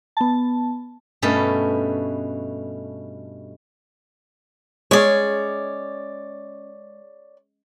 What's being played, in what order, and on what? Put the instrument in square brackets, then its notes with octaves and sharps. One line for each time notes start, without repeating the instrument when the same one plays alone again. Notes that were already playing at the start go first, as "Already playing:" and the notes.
[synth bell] B3 A5
[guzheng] G2 B2 A3 C#4 A4
[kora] G#3 C#4 [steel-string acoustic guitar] C#5 D5